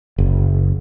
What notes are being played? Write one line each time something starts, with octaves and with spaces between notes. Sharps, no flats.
F#1